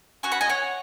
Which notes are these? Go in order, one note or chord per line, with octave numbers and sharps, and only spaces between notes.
C#4 F#4 G#5 C#6
F#5 B5
D#5 G#5
C#5 F#5